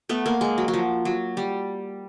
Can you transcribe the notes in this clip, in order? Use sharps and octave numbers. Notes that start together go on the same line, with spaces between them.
A3 B3
A#3
G#3
F#3
F#3
F3
F#3
G3